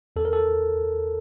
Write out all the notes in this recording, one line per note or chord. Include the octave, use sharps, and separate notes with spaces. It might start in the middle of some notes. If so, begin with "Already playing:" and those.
E2 A4
A#4
A4